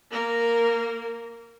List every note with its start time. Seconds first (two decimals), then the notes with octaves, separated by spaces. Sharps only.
0.11 A#3 A#4